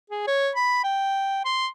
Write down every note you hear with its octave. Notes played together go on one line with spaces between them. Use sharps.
G#4
C#5
B5
G5
C6